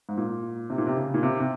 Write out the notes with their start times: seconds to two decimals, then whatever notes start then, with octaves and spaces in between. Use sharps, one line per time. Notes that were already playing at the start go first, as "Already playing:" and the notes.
0.09 G#2
0.18 A#2
0.70 C3
0.78 A#2
0.87 C3
0.97 C#3
1.14 A#2
1.23 C3
1.40 C3